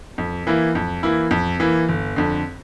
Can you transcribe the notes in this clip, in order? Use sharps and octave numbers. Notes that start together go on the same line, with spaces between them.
F2
E3 A#3 E4
F2
E3 A#3 E4
F2
E3 A#3 E4
G1
F2 D3